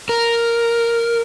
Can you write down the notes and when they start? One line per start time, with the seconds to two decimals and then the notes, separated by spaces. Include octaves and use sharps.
0.09 A#4